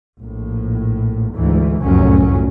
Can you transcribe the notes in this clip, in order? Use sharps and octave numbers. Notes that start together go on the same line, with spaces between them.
A#1 A2
D2 G#2 E3
F1 C2 F#2 A2 F#3 C#4